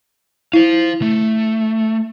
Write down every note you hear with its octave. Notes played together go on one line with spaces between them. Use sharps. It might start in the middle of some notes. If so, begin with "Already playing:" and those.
E4 C5 F5
A3